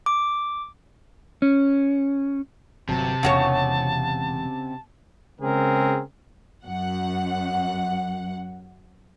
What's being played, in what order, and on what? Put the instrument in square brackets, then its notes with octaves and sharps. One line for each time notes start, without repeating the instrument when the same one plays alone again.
[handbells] D6
[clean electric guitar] C#4
[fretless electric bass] G1 F#3 [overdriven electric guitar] C3 [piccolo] A5
[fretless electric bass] E1 E2 [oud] C#3 F#4 C#5
[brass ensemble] C#3 G#3 C4 G#4 A#4
[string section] F#2 F#5